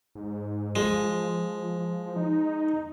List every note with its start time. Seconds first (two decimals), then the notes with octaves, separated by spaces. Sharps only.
0.15 G#2
0.76 F3 G#3
2.16 D#4